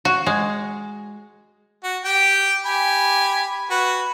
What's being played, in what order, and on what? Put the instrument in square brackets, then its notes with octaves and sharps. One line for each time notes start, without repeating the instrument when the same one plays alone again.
[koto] F#4
G#3
[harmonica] F#4
G4 G5
G4 G#5 B5
F#4 B4